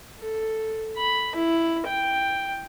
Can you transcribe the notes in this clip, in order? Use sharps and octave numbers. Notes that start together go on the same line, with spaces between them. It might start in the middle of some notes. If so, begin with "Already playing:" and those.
A4
B5
E4
G5